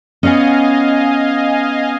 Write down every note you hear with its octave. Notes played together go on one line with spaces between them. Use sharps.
B3 C#4 D#5 F5 G#5